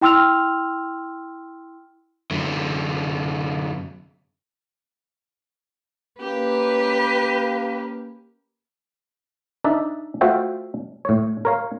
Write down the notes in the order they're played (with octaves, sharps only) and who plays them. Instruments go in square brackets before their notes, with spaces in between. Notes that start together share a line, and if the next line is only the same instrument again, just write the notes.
[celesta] E4 G5 C6 E6 F6 F7
[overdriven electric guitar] F#2 D3
[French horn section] A#3 C#4 [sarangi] G4 [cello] B4
[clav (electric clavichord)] D4 D#4 D5 E5
A3 F4 F#4 C5 E5 G5
A2 C#5
A#4 C#5 F5